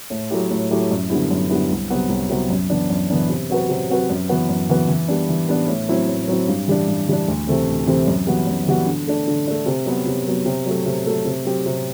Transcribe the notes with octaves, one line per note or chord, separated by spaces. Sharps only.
A2
F#3 A3 E4 G4
A2
F#3 A3 E4 G4
F#2
D3 G3 B3 E4
F#2
D3 G3 B3 E4
C2
C3 F#3 B3 F#4
C2
C3 F#3 B3 F#4
F#2
E3 B3 D4
F#2
E3 B3 D4
C3
F#3 C4 F#4 B4
C3
F#3 C4 F#4 B4
F#2
E3 B3 F#4 B4
F#2
E3 B3 F#4 B4
E3
G3 B3 D4
E3
G3 B3 D4
A2
F#3 C4 E4
A2
F#3 C4 E4
G2
E3 G3 D4
G2
E3 G3 D4
D2
C3 E3 A3 C4
D2
C3 E3 A3 C4
F#2
E3 G3 B3 F#4
F#2
E3 G3 B3 F#4
D3
A3 D4
D3
A3 D4
C3
F#3 B3
C3
F#3 B3
C3
F#3 A3
C3
F#3 A3
C3
F#3 C4 G4
C3